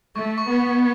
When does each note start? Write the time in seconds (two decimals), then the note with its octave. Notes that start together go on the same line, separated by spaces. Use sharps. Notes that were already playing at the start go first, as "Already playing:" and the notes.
0.16 A3 C#6
0.38 C#6
0.49 B3
0.61 C#6